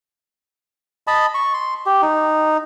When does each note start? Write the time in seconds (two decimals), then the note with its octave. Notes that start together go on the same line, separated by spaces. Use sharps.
1.07 D#5 A5 B5
1.35 C#6
1.54 C6
1.86 G4
2.02 D#4